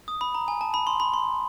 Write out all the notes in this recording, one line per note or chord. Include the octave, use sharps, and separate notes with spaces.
D#6
B5
A#5
G#5
A5
B5
C6
B5
C6